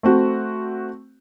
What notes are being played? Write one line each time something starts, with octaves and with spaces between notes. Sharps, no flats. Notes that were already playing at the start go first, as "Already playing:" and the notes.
A3 C4 F#4